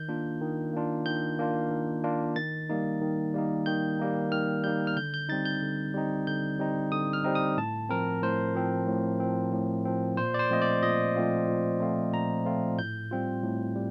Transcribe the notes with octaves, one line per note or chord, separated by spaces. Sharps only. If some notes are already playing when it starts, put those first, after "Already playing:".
Already playing: D#3 G6
A#3 D4 F4
D#3
A#3 D4 F4
D#3 G6
A#3 D4 F4
D#3
A#3 D4 F4
D#3 A6
G3 A#3 D#4
D#3
G3 A#3 D#4
D#3 G6
G3 A#3 D#4
D#3 F6
G3 A#3 D#4 G6
F6
D3 G6
G6
G3 C4 D#4 A6
G6
D3
G3 C4 D#4
D3 G6
G3 C4 D#4
D3 D#6
F6
G3 C4 D#4
D#6
A2 A5
F3 C4 A#4
A2 C5
F3 C4
A2
F3 C4
A2
F3 C4
A#2 C5
D5
C5
F3 A3 C4 F4 D#5
D5
A#2 D#5
F3 A3 C4 F4
A#2
F3 A3 C4 F4
A#2 A#5
F3 A3 C4 F4
A2 G6
G3 C4 F4
A2
G3